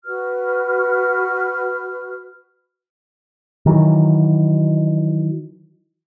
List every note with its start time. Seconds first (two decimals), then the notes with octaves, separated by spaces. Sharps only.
0.05 F#4 B4 F6
3.66 D#3 E3 F#3